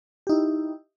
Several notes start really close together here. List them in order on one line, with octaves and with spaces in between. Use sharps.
G4 D#4 E4